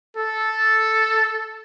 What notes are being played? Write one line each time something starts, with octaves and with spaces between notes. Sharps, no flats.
A4